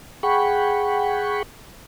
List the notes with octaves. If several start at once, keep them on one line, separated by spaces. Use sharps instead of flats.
G#4 F#5 G5 B5 C#6